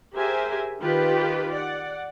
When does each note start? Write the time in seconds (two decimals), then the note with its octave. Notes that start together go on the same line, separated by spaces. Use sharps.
0.14 G4 G#4 A#4 C5 E5 G#5
0.79 D#3 F4 G4 B4
1.53 D5 F#5